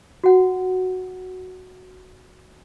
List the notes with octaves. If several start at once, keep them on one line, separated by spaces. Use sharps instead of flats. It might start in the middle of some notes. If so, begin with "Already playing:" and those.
F#4 F#5